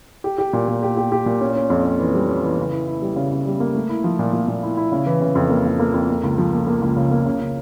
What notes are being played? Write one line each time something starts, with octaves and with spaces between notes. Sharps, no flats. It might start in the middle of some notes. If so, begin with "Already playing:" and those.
G4
G4
A#2
A#2
G4
G4
G4
A#2
C#4
C#4
F2
C#4
E3
G3
C#4
E3
C#3
E4
E4
G3
C#3
C#3
G3
A#3
A3
E4
F3
A#2
A#2
A#2
E4
E4
C#3
E3
C#3
F2
A#3
A#3
A#3
F2
A#3
C#2
F3
A#3
A#3
C#2
C#3
A#3
C#3
C#3